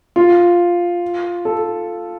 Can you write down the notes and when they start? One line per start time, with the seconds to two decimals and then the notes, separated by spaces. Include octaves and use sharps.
0.16 F4
1.45 A4